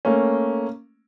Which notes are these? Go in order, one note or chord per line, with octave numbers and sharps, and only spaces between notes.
A3 A#3 C#4